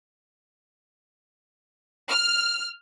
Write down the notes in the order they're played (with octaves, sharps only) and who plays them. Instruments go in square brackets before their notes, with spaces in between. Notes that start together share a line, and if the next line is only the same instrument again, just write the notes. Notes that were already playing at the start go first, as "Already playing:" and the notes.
[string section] F6